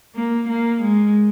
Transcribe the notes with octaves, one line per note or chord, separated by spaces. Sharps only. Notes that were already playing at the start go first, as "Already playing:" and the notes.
A#3
A#3
G#3